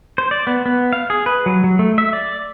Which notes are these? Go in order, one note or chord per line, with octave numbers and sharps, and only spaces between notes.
C5
D5
B3
B3
F5
G#4
B4
F#3
F#3
A3
E5
D5